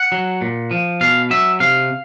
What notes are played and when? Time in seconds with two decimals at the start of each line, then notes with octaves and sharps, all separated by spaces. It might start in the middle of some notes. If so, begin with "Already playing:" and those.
Already playing: F#5
0.12 F#3
0.41 A#2
0.71 F3
1.01 B2 F5
1.31 F#3 E5
1.60 C3 F5